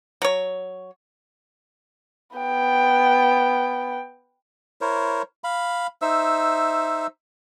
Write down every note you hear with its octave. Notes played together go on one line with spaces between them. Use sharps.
F#3 C#5
B3 G5
E4 A#4 C5 C#5
F5 B5
D#4 C5 E5 E6